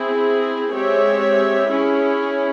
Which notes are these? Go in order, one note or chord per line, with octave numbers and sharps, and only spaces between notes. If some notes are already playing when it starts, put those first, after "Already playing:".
Already playing: C4 E4 G#4
G#3 C4 G4 C#5 E5
C#4 E4 G#4